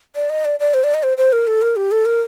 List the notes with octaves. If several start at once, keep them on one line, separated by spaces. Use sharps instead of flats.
D5
D#5
D5
D5
C5
D5
D#5
C5
C5
A#4
A4
A#4
G4
A4
A#4